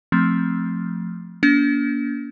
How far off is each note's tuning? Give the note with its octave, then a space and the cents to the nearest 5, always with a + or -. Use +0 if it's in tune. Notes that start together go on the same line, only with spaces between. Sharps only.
F3 +10 A3 +0 C4 +0
A#3 +25 D4 -45